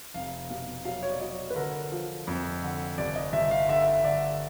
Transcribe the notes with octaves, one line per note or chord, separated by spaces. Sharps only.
F1 F5
B2 F5
F#3 F5
C#5
D5
F#3 D#5
B4
D3 A#4
F3
F2
D3
G1 D5
D#5
G1 E5
F5
D3 E5
D3 D5